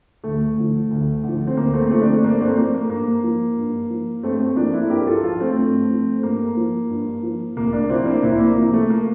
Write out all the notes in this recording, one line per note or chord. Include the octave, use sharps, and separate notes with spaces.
D2 A3
D3 F3
D2
D3 F3
C4
D2 A#3
A3 C4
A#3
D3 F3 A3 C4
D4
A3 C4
G2 A#3 D4
A3 C4
A3
F3 A#3
A#3
G2 A#3
F3
G2
F3
G2 A3 C4
A3 C4
F3 A#3 D4
C4 E4
G2 G4 A#4
F4 A4
F3 F4 A4
A3 C4
G2
F3
G2 A#3
F3
G2
F3
C2 A#3
A#3 D4
C3 F3 C4 E4
A#3 D4
C2 C4 E4
A#3
C3 F3 A#3
A3
A#3